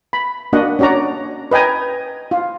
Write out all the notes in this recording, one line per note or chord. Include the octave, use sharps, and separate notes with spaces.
B5
A#3 D4 F#4 D#5 F#5
C#4 D4 F#4 D5 A#5
B4 D#5 G5 G#5 A#5
F4